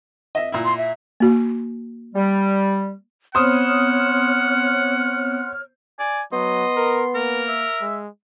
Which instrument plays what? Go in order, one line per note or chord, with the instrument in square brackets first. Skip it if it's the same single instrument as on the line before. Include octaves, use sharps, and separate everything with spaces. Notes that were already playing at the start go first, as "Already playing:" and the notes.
[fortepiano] D#5 E5
A#2 E4
[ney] C6
E5
[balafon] A#3 F#4
[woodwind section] G3
[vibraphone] B3 C4 [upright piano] C5 D#6 [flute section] C#5 F6 [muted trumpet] F#5
[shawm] D5 [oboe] G#5
[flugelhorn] F#3 [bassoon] B3 [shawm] D#5 [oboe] C6
[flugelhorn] A#4
[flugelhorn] A#3 [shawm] A#4
[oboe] E5
[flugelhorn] G#3